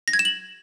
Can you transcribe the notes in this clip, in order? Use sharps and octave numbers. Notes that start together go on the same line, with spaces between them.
A#6
G#6
E7
F#7